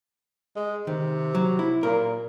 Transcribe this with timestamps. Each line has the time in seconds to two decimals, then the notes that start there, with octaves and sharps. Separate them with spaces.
0.56 G#3
0.87 C3 D#3
1.35 F#3
1.59 E4
1.83 A#2 A#4